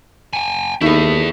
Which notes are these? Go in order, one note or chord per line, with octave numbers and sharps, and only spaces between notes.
G5 G#5
D#2 A3 B3 D#4 E4 G#4